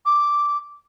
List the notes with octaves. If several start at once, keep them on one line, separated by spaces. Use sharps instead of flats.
D6